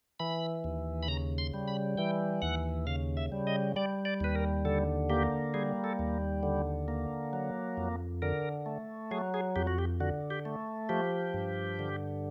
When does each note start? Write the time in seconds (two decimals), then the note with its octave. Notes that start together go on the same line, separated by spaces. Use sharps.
0.20 E3 B5
0.64 D#2
1.03 B5
1.08 C#3 A#5
1.38 C6
1.54 G3
1.68 B5
1.97 E3 G5
2.42 D#2 F#5
2.87 C#3 F5
3.17 E5
3.32 G3
3.47 D#5
3.76 G3 D5
4.05 D5
4.20 D#2 B4
4.35 A#4
4.65 D3 A4
5.10 A#3 G4
5.54 G3 G#4
5.84 A4
5.99 D#2
6.43 D3
6.88 A#3
7.33 F#3
7.77 F2
8.22 D3 A#4
8.66 A3
9.11 F#3 G#4
9.34 G#4
9.56 F2 G4
9.67 F#4
9.78 G4
10.00 D3 F#4
10.30 G4
10.45 A3
10.89 F3 G4
11.34 G2
11.79 D3